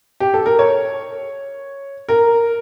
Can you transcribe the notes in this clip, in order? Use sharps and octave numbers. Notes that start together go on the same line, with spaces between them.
G4
A4
A#4
C#5
A#4